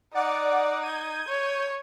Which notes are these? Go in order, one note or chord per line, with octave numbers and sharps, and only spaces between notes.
D#4 D5 F#5 D6
G6 G#6 D#7
C#5